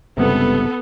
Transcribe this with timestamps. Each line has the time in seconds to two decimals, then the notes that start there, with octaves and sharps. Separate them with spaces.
0.17 G1 C#2 G2 C3 B3 A4